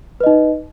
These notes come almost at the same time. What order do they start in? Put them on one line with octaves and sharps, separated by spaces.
B4 D#5 D#4